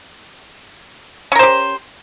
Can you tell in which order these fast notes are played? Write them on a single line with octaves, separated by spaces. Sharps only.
C#4 A#4 C5 G4